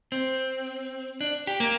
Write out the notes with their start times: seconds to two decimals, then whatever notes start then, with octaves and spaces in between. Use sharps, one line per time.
0.12 C4
1.21 D4
1.47 G4
1.60 A#3